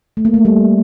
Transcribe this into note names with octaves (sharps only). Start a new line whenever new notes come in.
A3
A#3
A3
G3